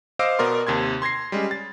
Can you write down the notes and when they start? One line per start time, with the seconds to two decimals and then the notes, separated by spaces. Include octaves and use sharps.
0.19 C5 D#5 F5 D6 E6 D7
0.39 B2 B3 A#4 D5 C6
0.67 D#2 C3 C6 G#6
1.02 C6 G#6 A#6 C7
1.32 G3 G#3 C#4
1.51 A6